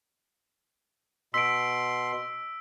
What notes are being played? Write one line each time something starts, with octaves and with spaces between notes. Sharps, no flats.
B2 C6 E6 B6 D7